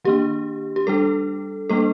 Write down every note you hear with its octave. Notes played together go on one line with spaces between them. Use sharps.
D#3 A#3 D4 G4
G4
G3 D4 A4
G3 A#3 D4 A4